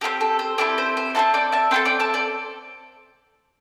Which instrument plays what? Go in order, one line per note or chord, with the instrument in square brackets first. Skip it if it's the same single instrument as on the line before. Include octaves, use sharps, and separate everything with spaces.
[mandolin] C4 E4 G4 A4
A4
C5
C4 E4 G4 A4 D5
C5
C5
C4 E4 A4 E5 A5
D5 G5
E5 A5
C4 E4 A4 G5 C6
D5 G5
E5 A5
A4 D5